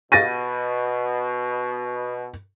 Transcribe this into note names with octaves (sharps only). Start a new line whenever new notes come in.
B2 A6 A#6 D#7